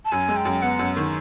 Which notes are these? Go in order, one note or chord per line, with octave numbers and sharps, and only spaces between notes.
A5
F#2 G#5
G#3
G5
F#2
B3 F#5
F#2
D#3